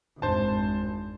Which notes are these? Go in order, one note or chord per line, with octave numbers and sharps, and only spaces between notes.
G#1 F2 D#3 D4 C5 A5